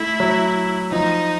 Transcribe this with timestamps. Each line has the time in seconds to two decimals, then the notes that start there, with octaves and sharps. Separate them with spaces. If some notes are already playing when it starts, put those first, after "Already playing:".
Already playing: A3 E4
0.20 F#3
0.92 F3 D#4